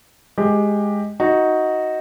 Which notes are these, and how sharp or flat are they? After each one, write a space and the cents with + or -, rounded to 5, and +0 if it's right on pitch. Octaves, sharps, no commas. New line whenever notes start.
G#3 +0 G4 +10
D#4 +10 F#4 +0